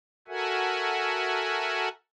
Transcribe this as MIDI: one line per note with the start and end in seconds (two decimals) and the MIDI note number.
0.28 1.89 66
0.28 1.89 69
0.28 1.89 70
0.28 1.89 76
0.28 1.89 78
0.28 1.89 80